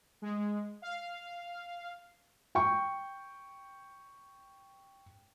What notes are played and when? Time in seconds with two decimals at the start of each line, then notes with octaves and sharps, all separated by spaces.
0.22 G#3
0.82 F5
2.55 G5 C#6